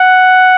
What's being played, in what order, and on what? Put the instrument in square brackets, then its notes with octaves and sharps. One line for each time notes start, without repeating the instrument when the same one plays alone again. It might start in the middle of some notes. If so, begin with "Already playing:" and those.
Already playing: [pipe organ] F#5